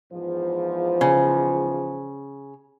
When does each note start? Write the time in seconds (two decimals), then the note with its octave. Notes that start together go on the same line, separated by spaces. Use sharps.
0.12 E2 G#2 F3
1.01 C#3